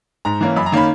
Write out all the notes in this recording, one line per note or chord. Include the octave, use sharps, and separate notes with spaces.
G#2 A#5
E3 A#3 C#4
F#2 B5
A#5
D#3 A#3 C#4 B5